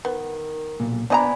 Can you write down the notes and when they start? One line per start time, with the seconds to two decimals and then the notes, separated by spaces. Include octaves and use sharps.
0.05 D#3 B3
0.80 B1 A#2
1.10 F3 B3 D4 D5 D#5 G#5 A#5 B5